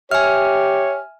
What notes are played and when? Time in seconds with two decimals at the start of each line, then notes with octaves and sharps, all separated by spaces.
0.11 G4 C#5 E5 G#5 F6